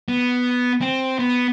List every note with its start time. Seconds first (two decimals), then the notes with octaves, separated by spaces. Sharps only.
0.09 B3
0.81 C4
1.19 B3